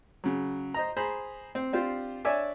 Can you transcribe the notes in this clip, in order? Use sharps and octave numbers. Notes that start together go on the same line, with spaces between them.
C#3 F#3
C5 D#5 A#5
G#4 C5 A#5 B5
C4
C4 D4 F4 G4 C5
D4 C#5 D5 E5 G#5 D6